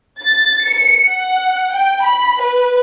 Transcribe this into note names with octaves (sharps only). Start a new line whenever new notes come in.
A6
C#7
F#5
G5
B5
B4